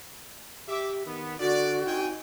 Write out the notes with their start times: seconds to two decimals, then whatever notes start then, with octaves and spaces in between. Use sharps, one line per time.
0.68 G4 E5 D6
1.06 D#3 B3
1.40 D3 F#4 D5
1.86 C4 D#4 G5 G#5